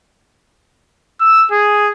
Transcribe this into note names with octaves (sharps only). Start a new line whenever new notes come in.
E6
G#4